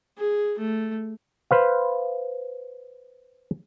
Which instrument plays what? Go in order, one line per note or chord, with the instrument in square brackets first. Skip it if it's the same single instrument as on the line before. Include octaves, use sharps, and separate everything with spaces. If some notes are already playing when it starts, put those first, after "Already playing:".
[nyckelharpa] G#4
A3
[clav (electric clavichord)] B4 C5 F5